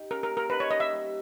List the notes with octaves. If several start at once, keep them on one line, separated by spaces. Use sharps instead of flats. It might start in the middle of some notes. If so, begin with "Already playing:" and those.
Already playing: D#4 G4
C#4 A#4
A#4
A#3
A#4
D#4 B4
C#5
A#3 D#5
E5
G3